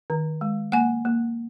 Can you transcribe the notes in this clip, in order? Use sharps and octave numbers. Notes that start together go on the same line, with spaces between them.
D#3
G#3
A#3 F#5 G#5
A#3